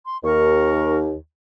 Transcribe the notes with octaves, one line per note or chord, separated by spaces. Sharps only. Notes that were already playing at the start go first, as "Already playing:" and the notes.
C6
D#2 A#4 C#6